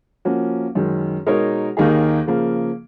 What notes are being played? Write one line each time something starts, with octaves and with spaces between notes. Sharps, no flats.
F3 A#3 C#4 F#4
F#2 D#3 G#3
B2 G#3 D#4 A#4 C#5
D#2 D#3 A#3 D#4 G#4
C#3 F3 A#3